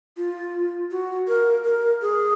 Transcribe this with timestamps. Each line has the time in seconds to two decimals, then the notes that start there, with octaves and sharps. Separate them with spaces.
0.17 F4
0.91 F#4
1.28 A#4
1.65 A#4
2.02 G#4